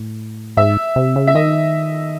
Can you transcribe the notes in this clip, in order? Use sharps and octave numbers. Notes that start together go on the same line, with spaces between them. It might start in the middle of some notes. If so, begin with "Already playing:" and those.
Already playing: A2
G#2 E5
C3
C#3
E5
D#3 D#5